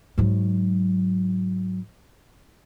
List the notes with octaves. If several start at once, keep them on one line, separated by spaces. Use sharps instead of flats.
G#2 F#3